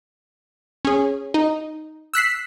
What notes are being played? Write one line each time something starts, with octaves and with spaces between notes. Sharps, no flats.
C#4 G#4
D#4
E6 F#6 B6 C7